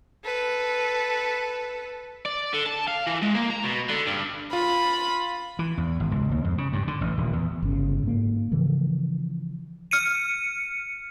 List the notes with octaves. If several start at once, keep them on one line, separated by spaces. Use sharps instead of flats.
A4 B4
D5
D3
A5
F5
E3
G#3
A#3
A#5
B2
D3
G2
F4 B5
E3
E2
G#1
C#2
D#2
F2
C#3
G2
D3
A1
D#1
E2
G1 C#3
G#2 A#3
C#3 E3 F3
F6 C#7 D#7